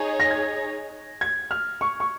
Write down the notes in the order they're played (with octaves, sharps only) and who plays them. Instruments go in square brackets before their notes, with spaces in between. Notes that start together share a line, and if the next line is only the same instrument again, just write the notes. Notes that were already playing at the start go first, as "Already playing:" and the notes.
Already playing: [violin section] D#4 G#4 C#5
[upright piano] A#6
G#6
G#6
F6
C#6
C#6